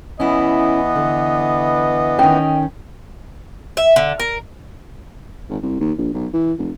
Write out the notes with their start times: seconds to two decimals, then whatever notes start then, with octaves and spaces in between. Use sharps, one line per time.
0.20 E3 B3 C#4 E4 D#5
0.96 D3
2.19 D#3 C#4 G5
3.77 E5
3.96 D3
4.20 A#4
5.49 G#1
5.62 C2
5.81 D#2
5.98 A#1
6.14 B1
6.33 E3
6.58 F1